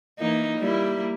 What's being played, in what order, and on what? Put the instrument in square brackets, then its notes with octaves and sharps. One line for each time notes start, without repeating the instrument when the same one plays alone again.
[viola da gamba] E3 A#3 D#4
G3 A#3 E4